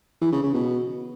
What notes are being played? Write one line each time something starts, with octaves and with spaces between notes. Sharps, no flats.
E3
C#3
C#3
B2